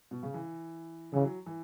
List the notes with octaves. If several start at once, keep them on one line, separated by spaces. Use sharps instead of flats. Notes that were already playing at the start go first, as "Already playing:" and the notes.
B2
C#3
E3
C#3 E3
F#3
E3